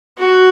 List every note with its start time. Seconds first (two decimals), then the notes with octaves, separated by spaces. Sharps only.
0.18 F#4